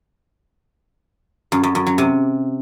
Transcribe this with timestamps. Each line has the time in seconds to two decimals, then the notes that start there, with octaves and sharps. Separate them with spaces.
1.52 F#2
1.63 F#2
1.75 F#2
1.86 F#3
1.98 C3